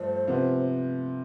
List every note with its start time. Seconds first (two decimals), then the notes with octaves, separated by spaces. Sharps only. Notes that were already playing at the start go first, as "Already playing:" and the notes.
Already playing: G2 F3 A3 D4 A4 C5
0.28 C3 F3 B3